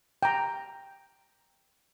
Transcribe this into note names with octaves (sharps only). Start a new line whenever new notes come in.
G5 A#5